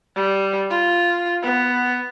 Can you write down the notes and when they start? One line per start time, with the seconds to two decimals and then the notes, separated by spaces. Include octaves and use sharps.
0.16 G3
0.70 F4
1.42 B3